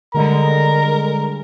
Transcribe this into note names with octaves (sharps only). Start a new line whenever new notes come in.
D3 G3 G#3 A#4 A#5